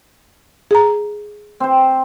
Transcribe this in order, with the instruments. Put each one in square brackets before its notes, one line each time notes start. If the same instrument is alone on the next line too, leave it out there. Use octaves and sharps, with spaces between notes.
[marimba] G#4 A#5
[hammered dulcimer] C4 C5